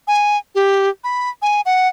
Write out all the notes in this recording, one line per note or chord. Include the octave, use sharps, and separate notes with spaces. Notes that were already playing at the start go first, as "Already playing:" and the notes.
G#5
G4
B5
G#5
F#5